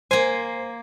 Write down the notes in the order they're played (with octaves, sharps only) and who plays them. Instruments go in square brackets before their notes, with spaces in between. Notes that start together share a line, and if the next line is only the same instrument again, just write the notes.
[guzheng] A#3 G#5 [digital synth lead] C5